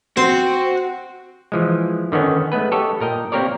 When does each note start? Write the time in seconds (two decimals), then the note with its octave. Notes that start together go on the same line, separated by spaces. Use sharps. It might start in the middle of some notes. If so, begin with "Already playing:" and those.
0.17 C4 F#4 C5 C6
1.52 E3 F3 G#3
2.12 D3 D#3 B3 C#4
2.52 G#3 A3 B3 B4
2.72 G4 A4 C#5 D#5
3.01 A#2 A#4 D#5 G5
3.32 A#3 C4 G4 A#4 C#5 D5